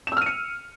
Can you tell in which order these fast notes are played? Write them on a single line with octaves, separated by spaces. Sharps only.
E7 E6 F6 D#7 C#7